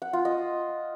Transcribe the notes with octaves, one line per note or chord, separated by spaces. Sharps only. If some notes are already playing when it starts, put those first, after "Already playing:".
F#5
F4
D#5